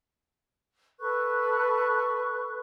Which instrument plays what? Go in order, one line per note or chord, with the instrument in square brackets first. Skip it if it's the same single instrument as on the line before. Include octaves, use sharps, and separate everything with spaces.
[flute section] A4 B4 C#6 F#6